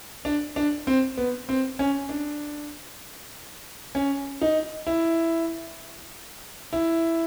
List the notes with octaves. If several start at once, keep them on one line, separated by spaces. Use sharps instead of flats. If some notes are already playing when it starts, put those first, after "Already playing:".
D4
D4
C4
B3
C4
C#4
D4
C#4
D#4
E4
E4